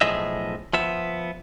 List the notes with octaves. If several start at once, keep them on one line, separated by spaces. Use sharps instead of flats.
B1 A2 F3 G#4 D#5 E5
F3 B3 E5